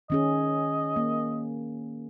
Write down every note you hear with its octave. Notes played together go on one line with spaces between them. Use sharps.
D#3 C#4 G#4 D#5
A#3